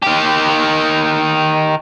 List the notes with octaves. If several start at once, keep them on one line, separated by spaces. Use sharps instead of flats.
D#3 G4